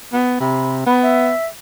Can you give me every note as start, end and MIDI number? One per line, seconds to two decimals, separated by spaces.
0.13 0.40 59
0.40 0.85 48
0.40 0.71 83
0.87 1.32 59
0.87 0.97 83
1.03 1.46 76